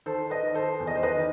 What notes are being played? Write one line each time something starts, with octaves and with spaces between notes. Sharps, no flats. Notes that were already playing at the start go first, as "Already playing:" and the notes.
D#3 A4 C5
B4 D#5
D#3
A4 C5
E2
D#5
C5
B4 D#5
D#3